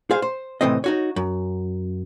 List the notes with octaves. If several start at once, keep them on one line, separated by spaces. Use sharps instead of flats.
G#4 C5 F5
C5
A2 C3 E3 C4 D#5
D#4 F#4 C#5
F#2